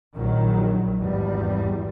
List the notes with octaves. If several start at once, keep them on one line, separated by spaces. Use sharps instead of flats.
A#1 D#3 F#3
G#1 E2 G3